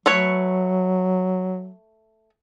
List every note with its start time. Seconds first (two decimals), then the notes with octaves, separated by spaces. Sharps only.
0.06 F#3 A3 B4 C#5